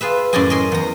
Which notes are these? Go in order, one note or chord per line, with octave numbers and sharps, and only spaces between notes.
F4 G#4 B4 E5
F#2 A2 C#4 D5 D#5 G#5
A#4 D#5 G#5 C6
E2 A#5